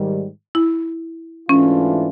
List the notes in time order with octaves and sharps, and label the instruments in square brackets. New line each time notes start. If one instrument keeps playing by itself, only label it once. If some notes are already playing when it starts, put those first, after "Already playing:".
Already playing: [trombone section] G#2 D#3 G3
[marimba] E4
[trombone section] G#2 E3 A3 D4 F4 [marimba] C#4